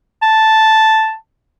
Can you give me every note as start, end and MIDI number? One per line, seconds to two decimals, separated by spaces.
0.22 1.15 81